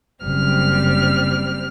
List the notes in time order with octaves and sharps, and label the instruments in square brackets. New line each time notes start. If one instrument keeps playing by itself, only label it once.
[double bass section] F#1 [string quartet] G3 C4 F6